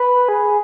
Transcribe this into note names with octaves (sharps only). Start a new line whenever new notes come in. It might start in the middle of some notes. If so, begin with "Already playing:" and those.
Already playing: B4
G#4